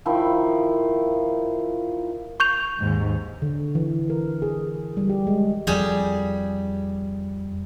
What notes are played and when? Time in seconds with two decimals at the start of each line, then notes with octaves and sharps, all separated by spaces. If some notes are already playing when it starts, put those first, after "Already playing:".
0.06 D#3 F3 E4
2.40 C#6 G6 F7
2.79 D#2 G#2
3.42 D3
3.75 E3
4.10 A#4
4.42 G#4
4.97 G3
5.09 G4
5.27 G#3
5.67 F2 F3 G3 G#4